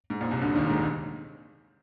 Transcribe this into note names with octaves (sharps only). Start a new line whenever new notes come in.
G#2
A#1 A#2
C2 C3
D2 D3
D#2 D#3
G#2 G#3